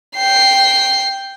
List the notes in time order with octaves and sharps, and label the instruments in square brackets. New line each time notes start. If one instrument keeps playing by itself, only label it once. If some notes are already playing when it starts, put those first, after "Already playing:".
[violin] G5 C7